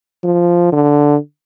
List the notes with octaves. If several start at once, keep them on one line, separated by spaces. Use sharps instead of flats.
F3
D3